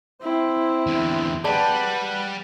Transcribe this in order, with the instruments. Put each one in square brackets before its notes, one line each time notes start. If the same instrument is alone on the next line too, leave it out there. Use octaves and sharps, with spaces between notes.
[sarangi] C4 [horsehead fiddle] E4
[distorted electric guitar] E2 D3
[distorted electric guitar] G3 [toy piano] G#4 D5 A5 [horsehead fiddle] B4 F#5